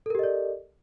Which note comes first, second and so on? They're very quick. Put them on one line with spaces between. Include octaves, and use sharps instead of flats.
A4 A#4 G4 D#5 D5